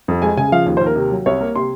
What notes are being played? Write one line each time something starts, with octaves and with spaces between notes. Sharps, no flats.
F2
G#3 G#5
C#3 G#5
F3 F5
D#2
C5
D#2
A#4
C3
F#3
C2 C#5
A#3
C3 C6